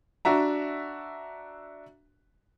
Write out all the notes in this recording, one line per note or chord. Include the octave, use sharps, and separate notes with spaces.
D4 F#4 E5 A#5